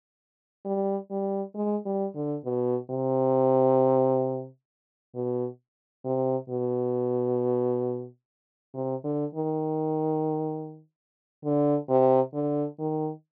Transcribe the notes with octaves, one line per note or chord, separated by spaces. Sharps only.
G3
G3
G#3
G3
D3
B2
C3
B2
C3
B2
C3
D3
D#3
D3
C3
D3
D#3